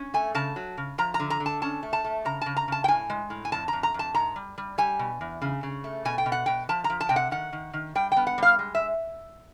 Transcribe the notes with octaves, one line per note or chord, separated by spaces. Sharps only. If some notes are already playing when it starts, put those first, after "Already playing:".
Already playing: C#4
A3 G#5
C#3 A5
F#3
C#3
F3 A#5
A#5
D3
A#5
D3
A5
C#4 A5
A3
A5
A3
C#3 A#5
C#3 A5
A#5
C#3 A5
G5
A2 G#5
G#3
A2
G#5
F2 A5
F2 A#5
A#5
F2 A5
G#2 A#5
G3
G3
G3 G#5
B2
E2
C#3
C#3
A3
B2 G#5
G5
B2
F#5
B2 G5
F3 A5
A#5
F3
A5
C3 G5
F#5
D#3 F#5
D#3
D#3
G3 G5
B3 G5
F#5
G3 F5
G#3
E5